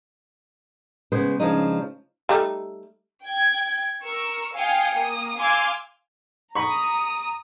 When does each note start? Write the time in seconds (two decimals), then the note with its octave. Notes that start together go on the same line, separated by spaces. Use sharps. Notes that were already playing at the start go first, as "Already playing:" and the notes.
1.12 C#3 G#3 B3 C5
1.40 C#3 F3 G#3 D4 D#4
2.29 G3 A3 D#4
3.25 G5 G#6
4.05 A#4 C#6 E6
4.55 F5 G5 G#5 D#6 C7 C#7
4.97 A#3 D#6
5.39 F5 G#5 C6 D6 E6 G#6
6.55 A#5 B5 C#6 D#6